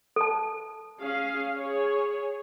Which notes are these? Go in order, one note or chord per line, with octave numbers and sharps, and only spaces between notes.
A4 A5
C#4 G#4 F5
G#4 C#5